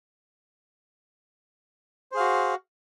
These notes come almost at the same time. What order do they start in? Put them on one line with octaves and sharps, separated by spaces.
C5 G#4 F5 F#4